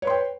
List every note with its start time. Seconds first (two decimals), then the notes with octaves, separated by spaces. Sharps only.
0.02 C#5
0.05 B4
0.07 C6
0.10 G5